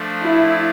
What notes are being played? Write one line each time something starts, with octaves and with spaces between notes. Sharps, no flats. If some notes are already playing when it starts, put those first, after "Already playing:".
Already playing: F3 A3 D4
E4